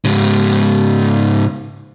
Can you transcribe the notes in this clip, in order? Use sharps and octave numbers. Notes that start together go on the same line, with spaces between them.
G#2 C#3